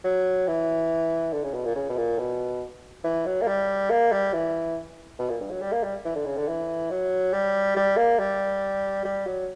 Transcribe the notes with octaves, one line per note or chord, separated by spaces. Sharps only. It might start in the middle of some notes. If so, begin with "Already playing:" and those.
F#3
E3
D3
C#3
B2
A#2
C#3
B2
A#2
B2
E3
F#3
A#3
G3
A#3
G3
E3
B2
A#2
G2
F#3
G3
A#3
G3
E3
D3
C#3
D3
E3
F#3
G3
G3
A#3
G3
G3
F#3